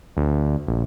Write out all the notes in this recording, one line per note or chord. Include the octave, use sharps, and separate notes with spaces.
D2
A#1